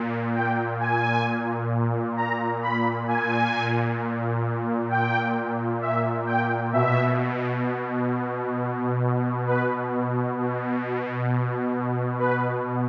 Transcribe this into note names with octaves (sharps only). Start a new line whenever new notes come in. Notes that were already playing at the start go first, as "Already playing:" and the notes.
Already playing: A#2
G5
G#5
A#5
B5
A#2 G#5
G5
E5
G5
B2 E5
B4
B2
B4